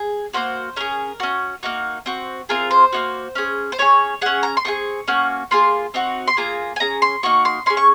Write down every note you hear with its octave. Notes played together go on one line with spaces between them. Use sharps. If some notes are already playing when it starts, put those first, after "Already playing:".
Already playing: G#4
A#3 C#4 F#4 C5
C#4 G#4 A#4
C#4 F#4
A#3 D#4 F#4
C4 F#4
C4 F4 G#4 A#4
C5
A#3 D#4 F#4
C#4 G#4
C5
C#4 F4 G#4 C#5
C#4 G#4 F#5
A#5
C6
C4 F4 G#4 C#6
A#3 C#4 F#4
A#3 F4 G#4 C6
C4 D#4 F#4
C6
A#3 F4 G#4 A#5
G#5
C#4 G#4 A#5
C6
A#3 D#4 F#4 C#6
C6
C#4 G#4 C6
C#6